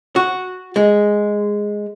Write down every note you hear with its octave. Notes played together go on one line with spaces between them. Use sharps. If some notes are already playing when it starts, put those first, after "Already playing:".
F#4
G#3